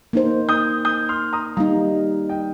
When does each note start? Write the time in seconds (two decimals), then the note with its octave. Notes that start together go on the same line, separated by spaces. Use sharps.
0.13 A#3 D#4 C5
0.49 D#6 G6
0.85 D#6 G6
1.09 C6 F6
1.33 A#5 D#6
1.56 G3 A#3 D#4 F5 A#5
2.29 D#5 G5